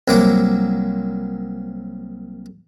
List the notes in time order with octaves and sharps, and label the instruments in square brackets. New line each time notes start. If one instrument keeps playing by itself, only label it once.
[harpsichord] C2 F#3 A#3 F#5 D6